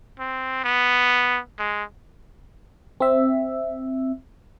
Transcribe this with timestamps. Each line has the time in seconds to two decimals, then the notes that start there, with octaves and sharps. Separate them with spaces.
0.19 C4
0.64 B3
1.59 G#3
3.00 C4 E5